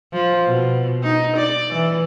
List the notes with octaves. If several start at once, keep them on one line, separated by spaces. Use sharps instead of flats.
F3
B2
D#4
D5
E3